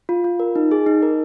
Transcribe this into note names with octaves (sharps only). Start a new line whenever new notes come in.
F4
F4
A#4
D#4
G#4
D#4
A#4